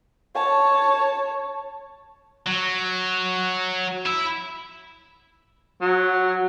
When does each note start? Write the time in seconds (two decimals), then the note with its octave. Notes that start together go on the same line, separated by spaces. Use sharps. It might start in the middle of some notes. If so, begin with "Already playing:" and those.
0.35 C#5 A5
2.46 F#3
4.06 E4
5.82 F#3